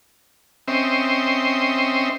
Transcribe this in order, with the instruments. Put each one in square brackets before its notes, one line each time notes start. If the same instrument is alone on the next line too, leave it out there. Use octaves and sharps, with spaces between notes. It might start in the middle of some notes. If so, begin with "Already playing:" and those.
[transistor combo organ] C4 C#4 C5 D#5 E5 G5